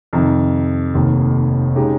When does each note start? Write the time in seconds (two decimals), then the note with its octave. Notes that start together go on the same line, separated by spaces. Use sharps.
0.13 F2 C3 D#3
0.94 F1 D#2 D#3
1.75 C#3 G#3 D#4 G4